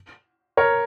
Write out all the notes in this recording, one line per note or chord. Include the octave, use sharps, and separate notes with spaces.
A#4 C#5